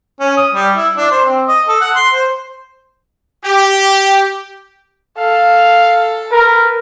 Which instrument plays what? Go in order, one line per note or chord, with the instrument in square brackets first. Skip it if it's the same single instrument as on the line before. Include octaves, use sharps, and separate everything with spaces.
[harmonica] C#4
D#6
G3
E4
D4
C5
C4
D#5
A4
F#5
C6
C5
[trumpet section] G4
[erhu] A4 [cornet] F5
[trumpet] A#4 [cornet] B4